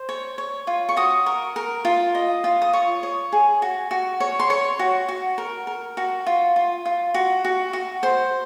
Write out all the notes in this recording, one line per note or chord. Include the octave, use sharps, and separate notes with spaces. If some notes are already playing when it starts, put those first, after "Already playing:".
Already playing: C5
C#5
C#5
F4
C#6
F#4 D#6
A#4
A#4
F4
D#5
F4
D#6
C#5 C#6
C#5
G#4
F#4
F#4
C#5
C6
C#5 C#6
F#4
F#4
A#4
A#4
F#4
F4
F4
F4
F#4
F#4
F#4
C5 C6